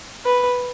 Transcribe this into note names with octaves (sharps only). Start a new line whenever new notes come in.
B4